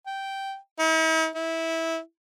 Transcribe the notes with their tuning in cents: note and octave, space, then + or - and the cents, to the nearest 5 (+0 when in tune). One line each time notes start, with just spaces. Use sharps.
G5 -10
E4 -45
E4 -15